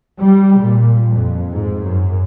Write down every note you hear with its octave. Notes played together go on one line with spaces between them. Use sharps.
G3
A#2
F2
G#2
F#2